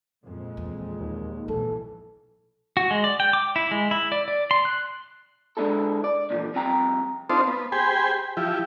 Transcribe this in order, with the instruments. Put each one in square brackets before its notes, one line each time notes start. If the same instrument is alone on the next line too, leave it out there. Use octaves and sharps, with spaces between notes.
[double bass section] F2 A#2 G#3
[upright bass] E2
[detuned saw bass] D#2
[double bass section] A#1 B2 E3 [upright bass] G#3 [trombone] A4
[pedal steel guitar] F#4
G#3
D5
G5
D6
E4
G#3
E4
D5
D5
C6
F#6
[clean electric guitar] D3 G#3 C#4 D4 E4 A4
D5
A#2 D3 E3 F3
C2 F3 C4 G5 A#5
[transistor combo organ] C4 D4 D#4 F4 A4 C5
B3
G4 G#4 C5 G5 G#5 B5
F3 E4 G4